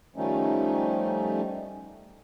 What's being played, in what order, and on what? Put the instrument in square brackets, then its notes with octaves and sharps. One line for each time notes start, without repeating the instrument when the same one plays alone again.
[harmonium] D#3 F3 G3 A3 C#4 D#4